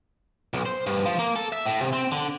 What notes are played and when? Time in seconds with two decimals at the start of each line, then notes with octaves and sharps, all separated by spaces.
0.53 B1
0.66 C5
0.87 G2
1.06 F3
1.19 A#3
1.36 A4
1.52 E5
1.66 A2
1.81 C3
1.93 C4
2.12 D3